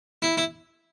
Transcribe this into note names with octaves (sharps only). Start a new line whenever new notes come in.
E4
E4